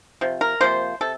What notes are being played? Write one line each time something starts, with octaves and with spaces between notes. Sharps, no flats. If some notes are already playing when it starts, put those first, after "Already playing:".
C3 F3
A#4
C3 F3 A#3 C5
C3 A4